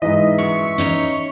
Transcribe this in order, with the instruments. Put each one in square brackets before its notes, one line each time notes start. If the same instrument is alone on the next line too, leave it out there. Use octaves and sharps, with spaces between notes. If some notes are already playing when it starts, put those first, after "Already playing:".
[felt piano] G#2 E3 [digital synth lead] D#5 [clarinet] E5
[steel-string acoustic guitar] F#2 [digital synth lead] C#6
[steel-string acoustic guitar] C#4 D#4 C#5